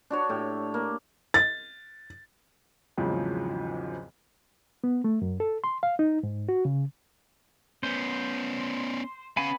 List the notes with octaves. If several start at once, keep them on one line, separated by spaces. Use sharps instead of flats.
D4 F#4 C#5
A2 G4
A#3
A6
G#1 E2 G#2 C#3 F3 F#3
B3
A3
F#2
A4
C6
F5
D#4
G#2
F#4
C#3
B3 C#4 C5
B3 C#4 F5 G#5 B5